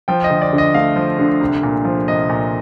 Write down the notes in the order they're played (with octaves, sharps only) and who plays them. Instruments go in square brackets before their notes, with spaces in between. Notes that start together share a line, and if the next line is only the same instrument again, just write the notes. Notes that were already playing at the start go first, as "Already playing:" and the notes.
[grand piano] F3 G5
D#5
D2
D5
D3
D#5
A3 F5
F3
D3
C2
A#2
F3
C2 D#5
A#2